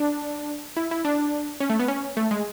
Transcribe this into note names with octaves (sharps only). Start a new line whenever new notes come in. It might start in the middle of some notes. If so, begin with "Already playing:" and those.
Already playing: D4
E4
E4
D4
C#4
A3
B3
C#4
A3
G#3